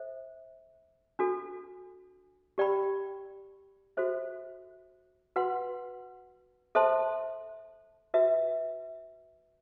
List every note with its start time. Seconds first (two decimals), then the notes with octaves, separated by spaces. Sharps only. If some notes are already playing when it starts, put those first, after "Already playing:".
Already playing: A4 C5 E5
1.19 D4 F#4 A4
2.58 G4 D5 G5 B5
3.97 F#4 A4 C5 E5
5.36 F#4 B4 F#5 C6
6.75 A4 C5 E5 A5 C6
8.14 F#4 B4 E5